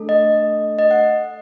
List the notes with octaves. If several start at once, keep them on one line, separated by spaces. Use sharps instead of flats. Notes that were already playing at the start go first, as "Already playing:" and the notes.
Already playing: A3 D4 A4
D#5
D#5
F#5